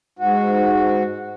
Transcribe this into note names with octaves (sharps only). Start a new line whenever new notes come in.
G#2 F#4